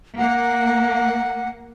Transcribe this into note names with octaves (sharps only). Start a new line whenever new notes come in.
A#3 F#5